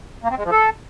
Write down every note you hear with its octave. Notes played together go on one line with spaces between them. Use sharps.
A#3
C4
G#3
F3
A4